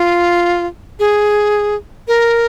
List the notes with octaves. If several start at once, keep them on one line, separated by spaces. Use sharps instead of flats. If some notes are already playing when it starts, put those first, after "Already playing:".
Already playing: F4
G#4
A#4